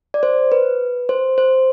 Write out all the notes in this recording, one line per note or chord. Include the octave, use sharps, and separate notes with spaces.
D5
C5
B4
C5
C5